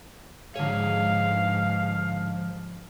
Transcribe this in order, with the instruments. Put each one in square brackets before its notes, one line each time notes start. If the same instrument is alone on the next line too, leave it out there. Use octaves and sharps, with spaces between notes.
[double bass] G#2 [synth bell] D3 G#4 [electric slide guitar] F3 C#5 [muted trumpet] F5